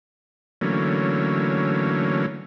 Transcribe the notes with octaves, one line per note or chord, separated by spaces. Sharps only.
D3 E3 F#3 A3 A#3 C#4